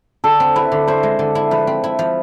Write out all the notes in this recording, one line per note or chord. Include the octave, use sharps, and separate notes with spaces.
D3 A4
C4
E4 B4
D3
E4 C5
G#3
D3
E4
F3 B4
C4
E4
F3